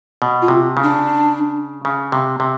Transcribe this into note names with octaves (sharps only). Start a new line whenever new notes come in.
B2
F4
C3
C#3
D4
C#3
C3
C3